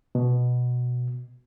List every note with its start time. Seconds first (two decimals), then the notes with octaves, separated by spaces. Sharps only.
0.15 B2